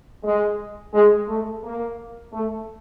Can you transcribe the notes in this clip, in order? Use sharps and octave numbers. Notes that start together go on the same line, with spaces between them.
G#3
G#3
A3
A#3
A3